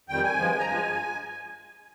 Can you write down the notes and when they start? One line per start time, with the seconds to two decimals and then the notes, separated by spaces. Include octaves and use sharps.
0.09 F2 D#3 G3 G5
0.23 G#5
0.37 G2 F3 G#3
0.59 A#5
0.66 G2 F3 G#3 G#5